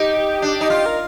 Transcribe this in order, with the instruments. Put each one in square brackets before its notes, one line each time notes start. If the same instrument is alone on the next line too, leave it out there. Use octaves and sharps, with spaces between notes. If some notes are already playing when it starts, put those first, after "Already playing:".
Already playing: [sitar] D#4 [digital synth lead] G4
[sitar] D4
D#4
F4
[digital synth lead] A#4